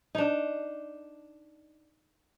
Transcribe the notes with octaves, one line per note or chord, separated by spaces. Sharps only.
D4 D#4